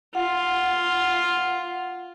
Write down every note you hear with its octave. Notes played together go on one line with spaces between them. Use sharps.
F4 F#5